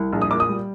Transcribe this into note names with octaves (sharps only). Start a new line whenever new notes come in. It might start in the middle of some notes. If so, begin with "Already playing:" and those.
Already playing: C2
A#1
D#6
A#2 D6
D#6
G3